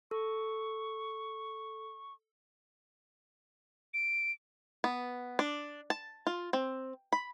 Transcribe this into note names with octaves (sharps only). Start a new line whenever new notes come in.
A4 C#6
D7
B3
D4
A5
F4
C4
B5